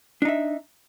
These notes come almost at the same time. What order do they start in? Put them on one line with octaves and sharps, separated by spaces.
D4 D#4 E5